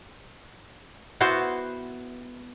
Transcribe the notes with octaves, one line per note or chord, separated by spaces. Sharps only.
B3 E4 F#4 C5